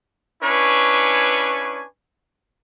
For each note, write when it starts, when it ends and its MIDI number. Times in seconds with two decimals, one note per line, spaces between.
0.43 1.83 61
0.43 1.83 62
0.43 1.83 64
0.43 1.83 71
0.43 1.83 80
0.43 1.83 85